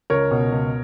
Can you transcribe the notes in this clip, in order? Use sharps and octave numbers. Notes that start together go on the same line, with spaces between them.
C#2 A#4 C#5
B2
C#2